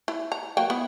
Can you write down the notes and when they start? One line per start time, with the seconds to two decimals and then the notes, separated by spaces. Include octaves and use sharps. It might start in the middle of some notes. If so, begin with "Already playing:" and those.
0.08 E4
0.32 A#5
0.57 F#3 A#3 G5
0.70 B3 E4